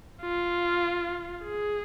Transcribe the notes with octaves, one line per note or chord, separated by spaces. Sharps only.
F4
G#4